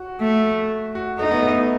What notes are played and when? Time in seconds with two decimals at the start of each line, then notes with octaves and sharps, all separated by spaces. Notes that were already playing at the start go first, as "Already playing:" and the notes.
Already playing: F#4
0.21 A3
0.95 F#4
1.19 A3 D#4
1.31 B3
1.42 A3